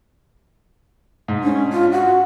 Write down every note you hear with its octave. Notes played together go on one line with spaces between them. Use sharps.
G#2
C#4 D4
F4
F#4 F#5